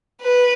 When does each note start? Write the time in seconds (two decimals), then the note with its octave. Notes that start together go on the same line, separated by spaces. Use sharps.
0.22 B4